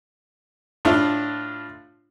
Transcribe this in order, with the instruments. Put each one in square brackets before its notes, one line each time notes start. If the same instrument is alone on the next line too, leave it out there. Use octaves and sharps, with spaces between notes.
[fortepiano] A2 D4 E4 F4